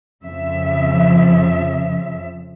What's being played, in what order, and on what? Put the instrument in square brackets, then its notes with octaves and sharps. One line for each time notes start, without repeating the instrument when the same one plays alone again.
[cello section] F2 C#3 F3 E5